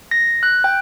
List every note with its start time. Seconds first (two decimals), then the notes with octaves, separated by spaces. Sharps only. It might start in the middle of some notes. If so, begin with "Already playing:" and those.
0.11 A#6
0.43 F#6
0.64 G5